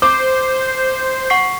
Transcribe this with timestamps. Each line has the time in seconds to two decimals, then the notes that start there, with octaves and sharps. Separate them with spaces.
0.02 C5 D6
1.30 F#5 C#6 C7